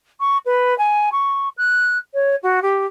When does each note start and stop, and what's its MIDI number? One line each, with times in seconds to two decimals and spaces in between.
0.20 0.38 85
0.46 0.77 71
0.78 1.09 80
1.12 1.49 85
1.57 1.98 90
2.14 2.35 73
2.42 2.60 66
2.62 2.86 67